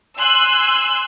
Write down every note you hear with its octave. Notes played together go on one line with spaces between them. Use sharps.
G#5 C6 E6 F#6